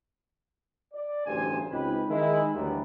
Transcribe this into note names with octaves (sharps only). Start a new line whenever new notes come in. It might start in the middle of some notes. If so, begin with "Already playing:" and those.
D5
A1 D2 G2 G#4 C5 G#5
C#2 C4 D#4 G4 B4
D#3 G#3 E4
D2 G2 E3 F#3 G3 B3